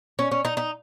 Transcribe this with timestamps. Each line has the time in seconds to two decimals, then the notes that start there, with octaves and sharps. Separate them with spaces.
0.19 C#4
0.31 C#4
0.45 D#4
0.57 D#4